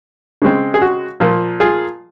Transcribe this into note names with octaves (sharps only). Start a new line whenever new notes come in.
C#3 G#3 C4
G#4
F#4
A#2 F3 A#3
F4 G#4